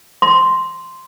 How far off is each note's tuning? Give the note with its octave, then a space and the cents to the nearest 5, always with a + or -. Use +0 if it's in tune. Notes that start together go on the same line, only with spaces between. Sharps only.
C6 -5